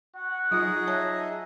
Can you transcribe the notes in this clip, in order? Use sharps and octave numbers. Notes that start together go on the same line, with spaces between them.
F#4 F#5
F#3 D#4 F4 G#4 D#5
C#5 E5 A5